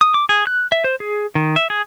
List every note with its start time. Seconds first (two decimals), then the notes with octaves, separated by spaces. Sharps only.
0.01 D#6
0.14 D6
0.29 G#4
0.47 F#6
0.72 E5
0.84 C5
1.00 G#4
1.35 D#3
1.56 E5
1.70 G#4